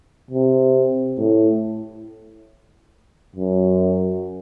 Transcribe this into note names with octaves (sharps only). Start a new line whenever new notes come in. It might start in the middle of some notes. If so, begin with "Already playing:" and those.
C3
A2
F#2